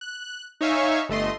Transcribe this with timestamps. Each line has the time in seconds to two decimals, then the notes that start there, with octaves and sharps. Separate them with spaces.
0.01 F#6
0.61 D#4 C#5 E5 F5 G#5 C#6
1.09 G1 A3 D#5 C6